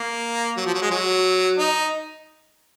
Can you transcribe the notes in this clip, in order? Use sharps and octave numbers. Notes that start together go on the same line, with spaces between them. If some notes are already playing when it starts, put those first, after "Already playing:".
Already playing: A#3
F#3
F3
F#3
G#3
F#3
D#4